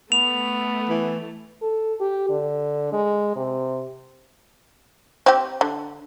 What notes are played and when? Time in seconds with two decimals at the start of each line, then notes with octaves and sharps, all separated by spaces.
0.12 A3 B3 F7
0.89 E3
1.62 A4
2.00 G4
2.30 D3
2.92 G#3
3.36 C3
5.26 C4 G4
5.61 D3